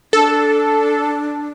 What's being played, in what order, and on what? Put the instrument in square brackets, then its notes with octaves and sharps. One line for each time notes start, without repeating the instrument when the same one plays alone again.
[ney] D4 [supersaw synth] A4